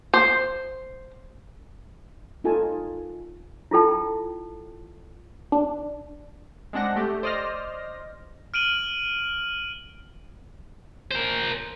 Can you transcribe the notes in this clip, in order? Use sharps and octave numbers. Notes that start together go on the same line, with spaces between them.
C5
D#4 F4 A4 G#5 A5
E4 F4 A4 G5 A5
D4
G#3 C4 D4 F#5 A#6
A3 G4
C5 D5 D#5 C6 F6 A#6
F6 D7 D#7 F#7
A#4 C5